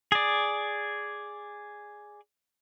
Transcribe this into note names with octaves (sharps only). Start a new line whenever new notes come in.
G#4 D5